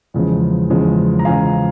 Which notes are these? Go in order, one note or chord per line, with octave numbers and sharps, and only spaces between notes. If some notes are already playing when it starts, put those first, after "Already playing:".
E2 C#3 F3 G#3
E2 C#3 F3 G#3
A#5
E2 C#3 F3 G#3 F5 G#5